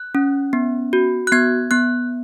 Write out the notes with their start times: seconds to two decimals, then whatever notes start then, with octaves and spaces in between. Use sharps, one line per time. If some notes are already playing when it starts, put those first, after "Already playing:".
Already playing: F#6
0.15 C#4
0.53 B3
0.93 F#4
1.27 F#6
1.32 B3 G#6
1.71 B3 F#6